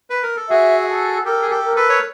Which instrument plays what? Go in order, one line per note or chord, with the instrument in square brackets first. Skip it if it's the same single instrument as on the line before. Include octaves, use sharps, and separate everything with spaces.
[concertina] B4
A#4
A4
[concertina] F#4 G#4 [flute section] E5
[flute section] A4
[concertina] G4 A4 [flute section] A#4
[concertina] G#4
G4 A4
[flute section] A#4
[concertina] A4 B4
C#5